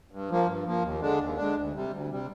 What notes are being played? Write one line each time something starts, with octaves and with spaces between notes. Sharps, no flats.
G2
F3 A#3
G2
F3 A#3
D#2
D3 G#3 D4
D#2
D3 G#3 D4
D2
C3 G3
D2
C3 G3